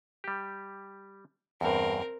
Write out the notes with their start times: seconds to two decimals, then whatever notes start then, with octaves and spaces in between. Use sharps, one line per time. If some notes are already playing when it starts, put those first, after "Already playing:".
0.24 G3 G4
1.61 E2 G2 C4 A#4